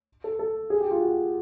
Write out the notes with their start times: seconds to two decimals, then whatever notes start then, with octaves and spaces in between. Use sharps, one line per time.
0.24 A4
0.39 A4
0.70 G#4
0.80 G4
0.91 F4
1.01 F#4